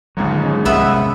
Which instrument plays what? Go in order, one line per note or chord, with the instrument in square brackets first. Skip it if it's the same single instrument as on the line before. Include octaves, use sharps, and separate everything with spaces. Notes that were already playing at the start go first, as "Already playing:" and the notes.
[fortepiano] A#1 D#2 G#2 [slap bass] D3 F#3
[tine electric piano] G#3 C#4
[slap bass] C2 F2 [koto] B3 B4 E5